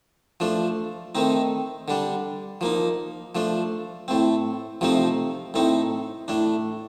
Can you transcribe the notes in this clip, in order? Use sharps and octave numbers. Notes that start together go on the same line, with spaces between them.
F3 A3 D4
D#3 A3 C4 D#4
D3 G3 D4
F3 A#3 D#4
F3 A3 D4
A2 A3 C4
C3 F3 A3 C4 D#4
A2 A3 C4 D#4
A2 A3 D4